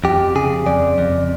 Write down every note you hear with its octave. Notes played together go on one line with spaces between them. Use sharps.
F2 G4
C#3 G#4
F2 D5
F2